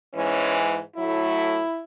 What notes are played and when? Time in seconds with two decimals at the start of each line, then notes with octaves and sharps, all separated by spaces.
0.14 G#2 E3 G#3 C#4
0.96 A2 F#3 A3 E4